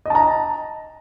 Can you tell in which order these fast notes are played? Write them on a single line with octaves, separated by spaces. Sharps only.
D#5 A5 A#5